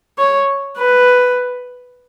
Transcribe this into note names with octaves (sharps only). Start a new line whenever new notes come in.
C#5
B4